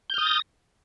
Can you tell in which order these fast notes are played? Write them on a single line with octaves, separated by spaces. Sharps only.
G6 F6 D#6 A6 A#6